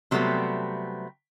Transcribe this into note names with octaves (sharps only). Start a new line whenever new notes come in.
C3 F#3 G3 A3 B3 C4